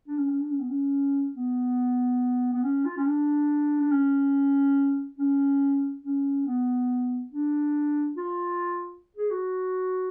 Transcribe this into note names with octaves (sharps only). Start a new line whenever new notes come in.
D4
C#4
C#4
D4
C#4
B3
C#4
B3
B3
C#4
F4
C#4
D4
D4
C#4
C#4
C#4
B3
D4
F4
G#4
F#4